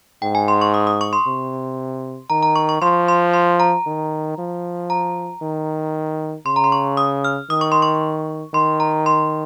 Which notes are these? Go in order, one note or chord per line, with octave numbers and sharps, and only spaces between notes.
G#2 G5
G#5
C6
C#6
D#6
D#6
C#6
C6
C3
D#3 A#5
A#5
C#6
C#6
F3 C6
C6
C6
A#5
D#3
F3
A#5
D#3
C#3 C6
A#5
C6
C#6
D#6
F6
D#3 D#6
C#6
C6
C#6
D#3 C6
A#5
C6